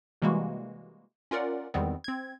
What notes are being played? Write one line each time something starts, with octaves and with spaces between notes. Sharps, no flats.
C3 E3 G3 G#3 A#3 F#4
C#4 F4 A#4 D5 F#5
E2 D#3 G3 G#3 B3 C4
C4 G#6